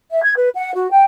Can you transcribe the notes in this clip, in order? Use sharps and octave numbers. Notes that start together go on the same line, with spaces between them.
E5
G#6
B4
F#5
F#4
G5